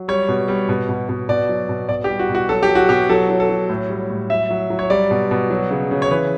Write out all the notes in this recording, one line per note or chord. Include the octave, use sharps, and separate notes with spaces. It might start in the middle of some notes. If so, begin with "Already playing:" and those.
Already playing: F#3
G3 C#5
B2
G3
B2
B2
B2
B2 D5
F#3
B2
B2 D5
G4
G3
F#4
B2
F#4
F#3 A4
G4
F#3
F#4
B2 G4
F#3 A4
F#3
A4
F#3
A2
G3
A2
F#3 E5
F#3
F#3
C#5
G3 D5
B2
B2
F#3
C#3
C#3
C#5
E3 B4